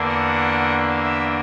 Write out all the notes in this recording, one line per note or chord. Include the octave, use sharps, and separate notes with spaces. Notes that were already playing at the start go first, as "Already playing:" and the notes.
Already playing: E2 D3 A#3 D4
F#5
E5